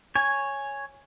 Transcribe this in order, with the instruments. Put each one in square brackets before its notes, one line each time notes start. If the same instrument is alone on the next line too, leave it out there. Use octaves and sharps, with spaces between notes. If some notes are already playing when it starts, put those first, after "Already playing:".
[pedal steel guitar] C#5 G#5